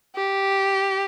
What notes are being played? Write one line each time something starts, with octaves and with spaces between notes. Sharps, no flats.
G4